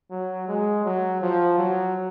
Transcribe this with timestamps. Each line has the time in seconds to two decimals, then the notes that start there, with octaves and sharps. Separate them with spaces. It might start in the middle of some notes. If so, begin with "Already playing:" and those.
0.11 F#3
0.48 G#3
0.85 F#3
1.21 F3
1.58 F#3